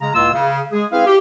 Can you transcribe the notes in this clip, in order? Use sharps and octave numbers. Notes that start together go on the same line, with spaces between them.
C#3 G#3 A#5
C#2 A2 G#3 A#3 F4 E6
C#3
G#3 G#4
C4 E4 G#4 B4 F5
G4